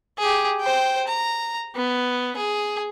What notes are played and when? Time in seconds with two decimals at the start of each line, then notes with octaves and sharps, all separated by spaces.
0.19 G4 G#4
0.61 C5 G5
1.08 A#5
1.75 B3
2.37 G#4